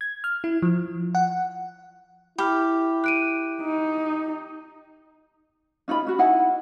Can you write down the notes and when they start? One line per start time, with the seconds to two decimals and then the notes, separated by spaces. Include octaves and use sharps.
0.01 G#6
0.24 F6
0.44 E4
0.62 F3
1.15 F#5
2.38 E4 G4 B5 F6
3.04 F#6 D7 D#7
3.62 D#4
5.88 C#4 D#4 F4 B5
6.07 C#4 F#4
6.19 D#4 E4 F#5 G#5